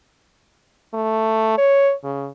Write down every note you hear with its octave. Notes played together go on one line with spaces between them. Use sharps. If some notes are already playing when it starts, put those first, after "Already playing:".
A3
C#5
C#3